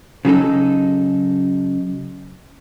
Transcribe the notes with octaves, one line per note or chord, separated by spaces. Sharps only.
C#3 F#3 D#4 A4